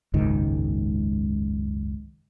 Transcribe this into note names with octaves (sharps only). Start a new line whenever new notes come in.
F#1 C#2 G#2 D#3